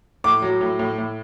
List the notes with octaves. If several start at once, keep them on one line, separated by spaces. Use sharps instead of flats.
A2 D6
F#3
A2
A2
A2